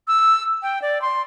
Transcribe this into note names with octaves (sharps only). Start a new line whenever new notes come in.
E6
G5
D5
C6